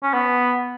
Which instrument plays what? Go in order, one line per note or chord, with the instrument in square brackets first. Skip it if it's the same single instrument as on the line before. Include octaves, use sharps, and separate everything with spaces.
[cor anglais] C#4
B3